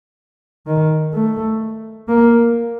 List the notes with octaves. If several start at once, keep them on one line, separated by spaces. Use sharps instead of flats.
D#3
A3
A#3